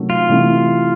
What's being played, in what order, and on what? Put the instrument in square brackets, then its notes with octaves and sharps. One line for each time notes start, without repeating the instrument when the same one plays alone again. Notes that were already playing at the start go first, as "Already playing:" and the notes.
Already playing: [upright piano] C3 D#3 F#3 A3 C#4
[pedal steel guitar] F4
[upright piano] C3 E3 A3